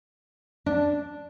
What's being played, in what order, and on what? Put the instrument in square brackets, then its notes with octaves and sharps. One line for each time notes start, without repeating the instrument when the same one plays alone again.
[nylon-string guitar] D4